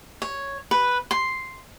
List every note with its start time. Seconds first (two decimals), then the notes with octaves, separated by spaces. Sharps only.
0.22 C#5
0.71 B4
1.11 C6